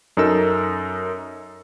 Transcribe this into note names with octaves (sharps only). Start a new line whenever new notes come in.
F#2 D#4 A4 A#4 E6